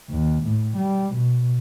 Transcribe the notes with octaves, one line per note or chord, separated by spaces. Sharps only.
D#2
A2
G3
B2